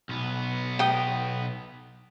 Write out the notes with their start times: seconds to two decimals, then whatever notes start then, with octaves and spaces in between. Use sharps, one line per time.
0.09 B1 B3
0.79 G5 D#6